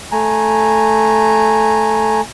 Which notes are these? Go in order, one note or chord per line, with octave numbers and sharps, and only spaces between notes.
A3 G#5 A#5